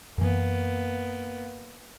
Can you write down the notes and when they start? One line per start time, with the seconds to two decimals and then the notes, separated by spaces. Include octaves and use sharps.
0.18 F#2 E3 A#3 B3